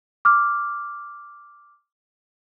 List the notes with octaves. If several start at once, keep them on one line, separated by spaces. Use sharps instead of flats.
D6 F6